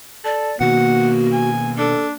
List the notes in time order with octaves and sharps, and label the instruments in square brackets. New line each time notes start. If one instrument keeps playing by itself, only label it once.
[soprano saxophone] A4 [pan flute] D5
[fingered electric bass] B2 D#3 [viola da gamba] A#3 [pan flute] F#4 [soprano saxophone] F#5
[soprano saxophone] G#5
[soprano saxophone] D4 [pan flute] A4